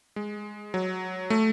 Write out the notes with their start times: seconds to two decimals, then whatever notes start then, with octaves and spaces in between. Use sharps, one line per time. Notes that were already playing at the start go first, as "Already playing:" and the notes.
0.16 G#3
0.74 F#3
1.30 A3